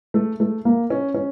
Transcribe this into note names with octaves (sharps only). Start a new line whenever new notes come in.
A3
A3
A#3
C#4
C#4